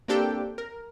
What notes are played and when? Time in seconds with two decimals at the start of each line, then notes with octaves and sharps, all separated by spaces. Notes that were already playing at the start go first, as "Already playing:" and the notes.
0.08 A#3 C4 D4 G4 A4 G5
0.58 A#4